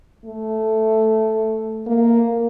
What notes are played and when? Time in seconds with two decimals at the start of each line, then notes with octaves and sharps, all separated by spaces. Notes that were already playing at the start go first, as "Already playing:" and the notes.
0.25 A3
1.87 A#3